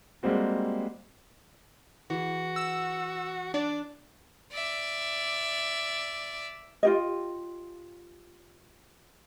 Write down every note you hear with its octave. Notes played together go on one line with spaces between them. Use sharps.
G3 G#3 A#3 C4 F#4
E3 F#4 G#4
E6
D4 D5
D5 E5
F4 G4 D#5